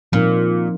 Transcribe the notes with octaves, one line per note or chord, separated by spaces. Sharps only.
A#2 F3 C4 D#4 A#4